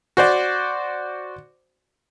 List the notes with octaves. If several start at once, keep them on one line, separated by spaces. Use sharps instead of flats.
F#4 C5 D5